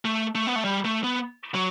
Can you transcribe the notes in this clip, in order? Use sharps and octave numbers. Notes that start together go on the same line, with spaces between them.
A3
A3
B3
A3
G3
A3
B3
F#3